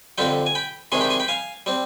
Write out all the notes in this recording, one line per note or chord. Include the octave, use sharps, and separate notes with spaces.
F2 D3 G3 C4 G5 B5
G#5
G5 B5
C3 D#3 G#3 D4 G#5 C6
G5 B5
G#5 C6
G5 B5
F5 G#5
G3 C4